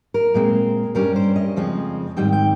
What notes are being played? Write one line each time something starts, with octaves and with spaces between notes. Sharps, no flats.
A#4
A#2 G#3 C4
G2 G3 C#4 A#4
C5
D#5
F2 C#3 F3 G#3 C4
G#2 D#3 G3 C4 G5
G5